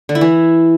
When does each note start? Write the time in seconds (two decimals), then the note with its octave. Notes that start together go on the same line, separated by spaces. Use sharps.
0.09 D3
0.15 E4
0.21 E3